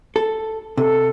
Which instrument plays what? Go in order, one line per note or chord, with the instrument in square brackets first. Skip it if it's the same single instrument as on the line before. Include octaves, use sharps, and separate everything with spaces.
[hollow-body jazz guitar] A4
[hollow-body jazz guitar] C3 [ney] A4